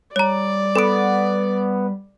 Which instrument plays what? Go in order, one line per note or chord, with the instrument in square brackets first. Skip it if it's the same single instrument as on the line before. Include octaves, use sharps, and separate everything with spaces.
[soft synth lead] G3 [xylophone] C#5 A#5 [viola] D5
[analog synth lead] B3 [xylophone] A4 D7